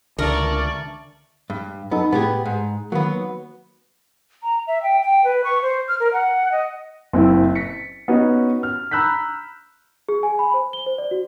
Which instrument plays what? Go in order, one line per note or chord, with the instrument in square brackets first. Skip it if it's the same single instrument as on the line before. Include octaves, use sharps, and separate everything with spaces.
[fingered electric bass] C#2 D4 [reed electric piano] D3 E5 A5 [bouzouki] A#4 [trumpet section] D5 C#6
[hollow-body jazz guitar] G2
[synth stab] F#2 D#4 A4 [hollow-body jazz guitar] B3
[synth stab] A2 [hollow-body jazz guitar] B3 G4 G#4
[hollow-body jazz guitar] G#2
[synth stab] D#3 A#3 [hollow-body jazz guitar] F#3 B3
[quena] A#5
E5
G5
G5
B4
C#6
C5
F6
A#4
F#5
D#5
[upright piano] F#1 C4 E4
A#6 B6 C#7
B3 C#4 D#4 F#4 D#5
F6
A#5 B5 E6 F#6 G6 B6
[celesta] G#4
G#5
B5
C5
G7
C5
D5
F#4